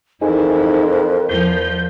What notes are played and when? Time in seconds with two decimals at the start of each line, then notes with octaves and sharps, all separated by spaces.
0.22 F2 E3 D#4 E4 G#4 A#4
1.29 E2 F3 G6